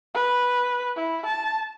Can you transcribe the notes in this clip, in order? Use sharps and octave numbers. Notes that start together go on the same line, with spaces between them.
B4
E4
A5